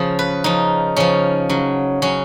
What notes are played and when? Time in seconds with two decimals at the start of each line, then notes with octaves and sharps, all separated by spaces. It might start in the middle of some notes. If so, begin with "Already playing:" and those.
Already playing: C#3 F3 G#4
0.19 B4
0.44 C#3 F3 D#4
0.96 C#3 F3 C#4
1.49 C#3 F#3
2.02 C#3 F#3 C#4